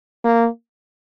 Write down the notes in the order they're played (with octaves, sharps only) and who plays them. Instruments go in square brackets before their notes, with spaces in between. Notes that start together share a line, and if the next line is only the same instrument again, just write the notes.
[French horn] A#3